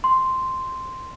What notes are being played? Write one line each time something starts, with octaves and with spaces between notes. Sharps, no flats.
C6